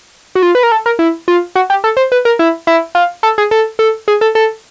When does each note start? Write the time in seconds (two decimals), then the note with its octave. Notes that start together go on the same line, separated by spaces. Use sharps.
0.35 F#4
0.43 F4
0.55 B4
0.63 A#4
0.72 A4
0.86 A#4
0.99 E4
1.28 F4
1.56 F#4
1.70 G4
1.84 A4
1.97 C5
2.12 B4
2.25 A#4
2.39 E4
2.67 E4
2.95 F4
3.23 A4
3.38 G#4
3.51 A4
3.79 A4
4.08 G#4
4.21 A4
4.35 A4